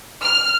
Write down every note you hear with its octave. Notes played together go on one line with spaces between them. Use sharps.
F6